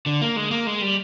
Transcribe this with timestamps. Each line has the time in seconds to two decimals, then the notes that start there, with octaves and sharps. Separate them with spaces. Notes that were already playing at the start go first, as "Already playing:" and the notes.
0.06 D3
0.21 A#3
0.36 G#3
0.51 A#3
0.67 G#3
0.82 G3